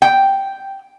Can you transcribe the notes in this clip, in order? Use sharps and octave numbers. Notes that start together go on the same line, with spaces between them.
G5